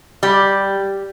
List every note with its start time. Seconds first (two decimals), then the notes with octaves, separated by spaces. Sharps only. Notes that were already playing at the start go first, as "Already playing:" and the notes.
0.23 G3 G4